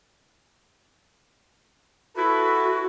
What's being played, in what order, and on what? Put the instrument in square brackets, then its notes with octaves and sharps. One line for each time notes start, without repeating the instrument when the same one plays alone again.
[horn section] E4 A4 B4 [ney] F#4